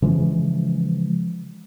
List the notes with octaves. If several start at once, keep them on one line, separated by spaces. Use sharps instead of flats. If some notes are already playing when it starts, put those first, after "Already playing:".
C#3 E3 F3 G#3